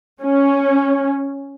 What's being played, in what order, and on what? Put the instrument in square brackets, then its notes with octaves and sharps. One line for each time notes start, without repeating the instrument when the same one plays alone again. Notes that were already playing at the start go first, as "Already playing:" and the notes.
[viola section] C#4